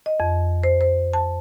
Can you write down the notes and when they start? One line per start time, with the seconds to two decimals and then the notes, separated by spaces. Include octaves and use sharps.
0.06 D#5
0.20 F2
0.64 C5
0.81 C5
1.13 A5